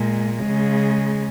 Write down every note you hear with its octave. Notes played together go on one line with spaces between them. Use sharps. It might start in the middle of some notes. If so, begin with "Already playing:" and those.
Already playing: A#2 G#3
G#3
C#3